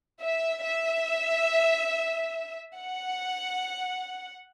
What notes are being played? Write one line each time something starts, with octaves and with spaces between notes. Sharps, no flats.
E5
E5
F#5